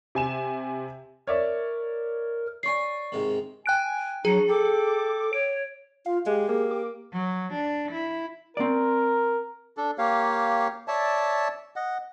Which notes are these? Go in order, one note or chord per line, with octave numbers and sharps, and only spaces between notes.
C3 G#5 E7
A#4 C#5 D5 E5
C#5 D5 G#5 C#6 C7
G#2 C3 D#3
G5 G#5 F#6 D7
F#3 D4 F#4 G#4 A#5 C#7
A4 G5 A5 D6
C#5 D7
F4 F5
G#3 G4
A#3 G#4
D6
F#3
D4
E4
C4 A#4 D5
D4 A4
A#3 G4 C#5 F5
C#5 D5 E5 A5
D#5 F#5